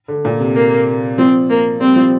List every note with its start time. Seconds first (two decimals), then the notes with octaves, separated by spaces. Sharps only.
0.08 D3
0.25 A#2
0.40 C3
0.55 A#3
1.18 F3 C4
1.50 A#3
1.80 G3 C4
1.96 F3